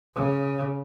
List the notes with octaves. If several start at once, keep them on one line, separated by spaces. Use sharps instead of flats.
C#3